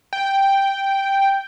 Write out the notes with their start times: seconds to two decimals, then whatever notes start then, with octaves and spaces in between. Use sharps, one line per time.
0.13 G5